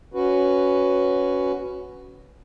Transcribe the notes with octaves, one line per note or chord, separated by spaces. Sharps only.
C#4 F#4 B4